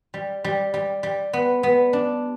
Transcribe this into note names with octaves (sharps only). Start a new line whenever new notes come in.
G3
G3
G3
G3
B3
B3
D4